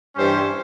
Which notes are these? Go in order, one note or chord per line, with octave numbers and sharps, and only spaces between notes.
G2 E3 G3 C#4 C5